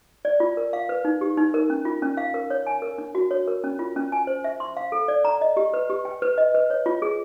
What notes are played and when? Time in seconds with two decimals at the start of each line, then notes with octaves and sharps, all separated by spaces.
0.25 D5
0.40 F4
0.57 A#4
0.73 F5
0.89 B4
1.05 D#4
1.21 G4
1.37 D#4
1.54 A#4
1.70 C#4
1.85 F4
2.02 C#4
2.17 F5
2.34 A#4
2.50 C#5
2.67 G#5
2.82 A#4
2.98 D4
3.15 F#4
3.31 C#5
3.48 A#4
3.64 C#4
3.79 F4
3.96 C#4
4.12 G#5
4.27 C5
4.44 E5
4.60 C6
4.77 F5
4.92 A4
5.08 D5
5.25 A#5
5.41 D#5
5.57 G4
5.74 B4
5.90 G4
6.05 G5
6.22 B4
6.38 D#5
6.54 B4
6.70 C#5
6.86 F4
7.02 G#4